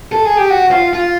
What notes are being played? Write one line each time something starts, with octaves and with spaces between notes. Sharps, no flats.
A4
G#4
G4
F#4
F4
F4